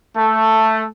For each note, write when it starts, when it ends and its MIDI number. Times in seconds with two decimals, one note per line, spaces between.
0.16 0.85 57